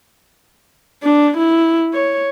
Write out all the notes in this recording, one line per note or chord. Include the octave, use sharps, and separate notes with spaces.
D4
E4
C#5